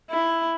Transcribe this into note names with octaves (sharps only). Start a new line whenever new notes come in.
E4